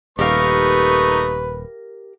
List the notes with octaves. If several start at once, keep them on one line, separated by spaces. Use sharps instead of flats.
D#1 A3 D#4 G4 A#4 B4 F5 C#6